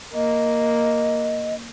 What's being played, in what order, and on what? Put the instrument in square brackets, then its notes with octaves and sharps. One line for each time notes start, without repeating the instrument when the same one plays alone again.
[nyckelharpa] A#3 [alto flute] D#5